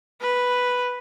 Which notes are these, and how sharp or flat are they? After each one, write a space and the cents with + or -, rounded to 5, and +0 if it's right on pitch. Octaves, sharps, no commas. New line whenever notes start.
B4 +0